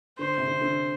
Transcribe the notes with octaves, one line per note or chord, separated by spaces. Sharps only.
D3 C5
C3
D3
D3